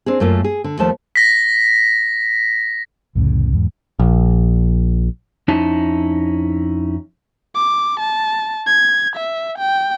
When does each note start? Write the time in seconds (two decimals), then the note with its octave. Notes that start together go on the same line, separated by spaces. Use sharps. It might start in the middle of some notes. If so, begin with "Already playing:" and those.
0.06 C4 D4 G#4
0.20 F#2 A3 A#3 F4
0.44 G#4
0.64 D3
0.79 D#2 F3 A3 A5
1.16 A#6 B6
3.15 C2 F2 A2 C#3
3.52 E2 G#2
3.99 A#1
5.48 F2 C#4 D#4 E4 A5
7.55 D6
8.00 A5
8.67 G#6
9.16 E5
9.59 G5